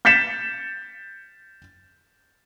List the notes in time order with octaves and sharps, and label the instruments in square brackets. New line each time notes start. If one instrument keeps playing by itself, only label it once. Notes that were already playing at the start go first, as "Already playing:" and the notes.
[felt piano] G6 A6 B6 C#7 E7